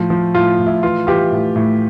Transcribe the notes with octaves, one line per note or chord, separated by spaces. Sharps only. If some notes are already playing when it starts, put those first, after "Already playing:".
Already playing: A2 F3
F3
A2 F4
A2
E4
E3 F4
E3 F4 G4
A2
A2